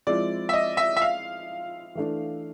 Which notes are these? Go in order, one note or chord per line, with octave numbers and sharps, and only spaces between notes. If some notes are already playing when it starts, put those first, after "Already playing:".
F3 G#3 C4 E4 D5
E5
D#5
E5
E5
F5
E3 A3 D4